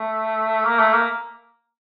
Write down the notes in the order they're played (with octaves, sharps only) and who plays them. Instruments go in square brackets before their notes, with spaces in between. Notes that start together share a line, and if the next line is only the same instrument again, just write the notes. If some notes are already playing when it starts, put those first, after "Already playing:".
Already playing: [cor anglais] A3
A#3
A3
A#3